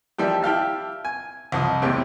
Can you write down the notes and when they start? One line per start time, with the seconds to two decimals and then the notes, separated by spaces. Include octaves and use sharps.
0.18 D#3 F3 G3 E4 G4
0.42 E4 G4 F5 A5
1.05 G#5
1.52 C2 F3 D#5
1.82 E2 A2 C3 C4